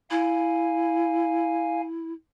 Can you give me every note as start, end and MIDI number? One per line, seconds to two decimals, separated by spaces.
0.11 2.13 64
0.11 1.81 77
0.11 1.81 80